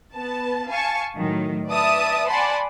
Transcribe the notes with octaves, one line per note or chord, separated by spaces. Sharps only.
B3 A5
F5 G#5 A5 C#6
A2 D#3 F#3
B4 D5 E5 A5 D#6
D5 F#5 G#5 A5 B5 C6